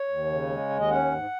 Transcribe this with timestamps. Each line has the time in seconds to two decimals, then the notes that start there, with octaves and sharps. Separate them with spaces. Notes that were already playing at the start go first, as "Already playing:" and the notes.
Already playing: C#5
0.08 D#2
0.29 C#3
0.49 G#3
0.69 D#2
0.79 D#5
0.90 C#4 F#5
1.11 G#2